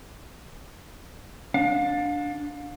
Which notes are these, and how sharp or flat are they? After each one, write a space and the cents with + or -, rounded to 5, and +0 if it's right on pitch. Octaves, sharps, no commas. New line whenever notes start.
D4 +0 F5 +35